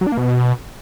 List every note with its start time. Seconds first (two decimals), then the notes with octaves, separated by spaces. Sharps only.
0.01 F#3
0.07 D4
0.12 A#3
0.18 B2